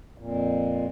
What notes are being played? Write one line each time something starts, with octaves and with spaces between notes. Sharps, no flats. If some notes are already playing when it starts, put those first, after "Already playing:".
F2 A#2